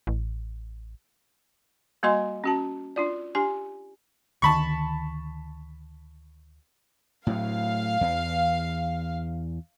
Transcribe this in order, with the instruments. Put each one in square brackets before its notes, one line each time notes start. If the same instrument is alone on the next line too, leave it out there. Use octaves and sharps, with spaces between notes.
[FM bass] A1
[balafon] G3 A#3 F#4 D#5 G#5 C6
C#4 F#4 A5
D4 F4 D5
D4 G4 G#5
[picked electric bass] D2 D3 D#3 [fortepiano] A5 B5 C#6
[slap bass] A2 F#3 [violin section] F5
[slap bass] E2